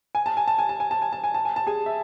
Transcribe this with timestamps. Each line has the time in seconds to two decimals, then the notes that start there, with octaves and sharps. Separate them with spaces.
0.15 G#5
0.26 A5
0.37 G#5
0.48 A5
0.58 G#5
0.69 A5
0.80 G#5
0.91 A5
1.02 G#5
1.13 A5
1.24 G#5
1.34 A5
1.45 G#5
1.56 A5
1.67 G#4 G#5
1.86 E5